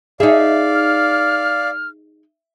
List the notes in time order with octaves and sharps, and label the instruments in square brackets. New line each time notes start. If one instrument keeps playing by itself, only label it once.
[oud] D#4 G#4 [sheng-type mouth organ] D5 F5 [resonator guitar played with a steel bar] E5
[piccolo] F6